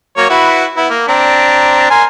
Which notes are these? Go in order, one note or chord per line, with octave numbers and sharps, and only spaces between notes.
F#3 A#3 C#5
E4 F#4 B4
B3 E4
A#3
C4 D4 A#5
A#4 G#5 C6